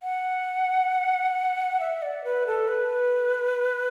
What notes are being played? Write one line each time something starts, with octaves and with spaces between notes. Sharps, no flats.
F#5
E5
D5
B4
A4
B4